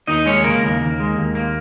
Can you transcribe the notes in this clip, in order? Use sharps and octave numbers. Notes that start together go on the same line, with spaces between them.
D#2 D#4 D#5
G#3 C#4 C#5
C#3 A#3 A#4
D#2
D#2
G#3
D#2
A#3